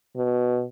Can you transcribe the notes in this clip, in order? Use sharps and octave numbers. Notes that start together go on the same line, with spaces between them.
B2